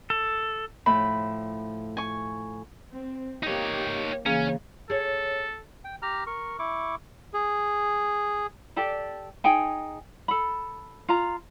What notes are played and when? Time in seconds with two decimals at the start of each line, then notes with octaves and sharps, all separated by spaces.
0.10 A4
0.86 A2 F3 B5
1.97 G#5 C#6
2.91 C4
3.43 A#3 D#4 G4 C#5
4.26 C#3 E3 A#3 C#4 G#4 F5
4.90 G#4 A4 C#5
5.84 G5
6.02 G4 A#5 F6
6.27 A#4 C#6
6.59 E4 C#6 D6
7.34 G#4
8.76 G4 A4 D5
9.44 D#4 G#4 G5 G#5
10.28 A4 B5
11.09 F4 A#5